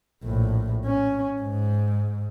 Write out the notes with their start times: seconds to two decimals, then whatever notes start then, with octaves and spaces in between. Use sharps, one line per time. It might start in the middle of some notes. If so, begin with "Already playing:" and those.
0.24 A#1 A2
0.85 C#4
1.41 G#2